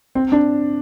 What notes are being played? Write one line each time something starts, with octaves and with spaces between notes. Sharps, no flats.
C4
D4